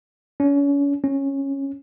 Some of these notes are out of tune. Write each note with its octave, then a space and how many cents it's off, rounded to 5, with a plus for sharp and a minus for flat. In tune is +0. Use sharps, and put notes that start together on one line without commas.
C#4 +35
C#4 -10